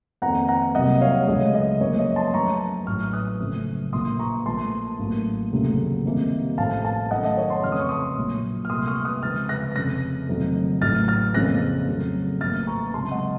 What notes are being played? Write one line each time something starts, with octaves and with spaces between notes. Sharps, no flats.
F2 D#3 A#3 F#5 A#5
F#5 A#5
C2 C3 F#3 A#3 D#5 F#5
C#5 F5
C#2 C#3 F#3 A3 D#5
D#5
F#2 F3 A#3 C#5
D#5
A5 C6
F#2 F3 A3 A#5 C#6
A1 A2 F#3 C#6 F6
F6
D#6 F#6
F#1 F#2 F3 A3
A#1 A#2 F3 A#3 C6 D#6
A#5 C#6
A#1 A#2 F3 A3 A5 C6
A1 A2 F#3 A#3
F1 D#2 C#3 F#3 A3
C2 C3 D#3 A#3
A1 A2 F3 A3 F5 A5
F5 A5
F#2 D#3 A3 D#5 F#5
D#5
C#5
A5 C6
F2 C#3 F3 A3 F6
D#6
C#6
C6 D#6
A#1 A#2 F#3
F6
C2 A#2 A3 C6 D#6
C#6 F6
D#6 F#6
C#2 C3 F3 F6 A6
F#6 A#6
F1 F2 C#3 F3 F#6 A#6
F#1 F2 D#3 F#3 A3
A1 A2 F#3 F6 A6
F6 A6
F2 C#3 F3 A#3 F#6 A#6
F2 C#3 F#3 A3
A1 A2 F3 A#3 F6 A6
A#5 C#6
C#2 C3 F#3 A5 C6
D#5 F#5